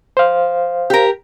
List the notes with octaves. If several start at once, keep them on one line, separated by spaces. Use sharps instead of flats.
C5 F5
G4 A#4